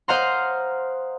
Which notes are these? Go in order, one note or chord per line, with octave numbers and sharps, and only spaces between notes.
C5 D#5 F5 F#5 A#5 C6